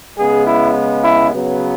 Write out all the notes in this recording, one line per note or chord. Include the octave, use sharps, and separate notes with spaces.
C#3 G#3 B3 G#4
E4
E4
C#3 F#3 B3